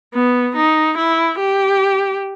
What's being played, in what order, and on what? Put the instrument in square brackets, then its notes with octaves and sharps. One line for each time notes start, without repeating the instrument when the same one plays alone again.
[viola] B3
D#4
E4
G4